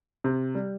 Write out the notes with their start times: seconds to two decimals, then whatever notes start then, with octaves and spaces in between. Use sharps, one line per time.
0.24 C3
0.55 G3